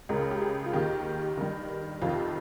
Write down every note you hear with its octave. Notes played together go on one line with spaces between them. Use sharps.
C#2 C#3 A#4
G4
G#4
F4
D#2 D#3 G4
G2 D#3
F2 C3 D#3 F4